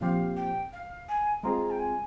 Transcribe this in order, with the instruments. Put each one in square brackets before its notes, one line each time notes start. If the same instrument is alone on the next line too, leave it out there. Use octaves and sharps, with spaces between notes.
[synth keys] A#2 F3 C4 G4 [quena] F5
[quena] G5
F5
G#5
[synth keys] G#3 C4 F4 G#4 [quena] A#5
[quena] G5
G#5